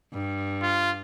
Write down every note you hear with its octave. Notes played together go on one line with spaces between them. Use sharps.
G2
F4